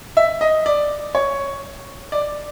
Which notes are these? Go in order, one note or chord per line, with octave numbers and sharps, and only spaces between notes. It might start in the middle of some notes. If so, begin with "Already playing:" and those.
E5
D#5
D5
C#5
D5